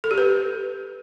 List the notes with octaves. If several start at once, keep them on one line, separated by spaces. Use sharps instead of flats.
A4
G4
B4